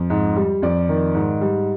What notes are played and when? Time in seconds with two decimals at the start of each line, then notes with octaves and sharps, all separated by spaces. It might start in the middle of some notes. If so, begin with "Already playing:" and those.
Already playing: F2
0.10 G#2
0.36 G3
0.62 F2 D5
0.89 D#3
1.15 G#2
1.41 G3